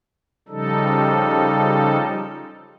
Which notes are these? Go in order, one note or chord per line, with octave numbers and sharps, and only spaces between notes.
C#3 F3 G3 D#4 A4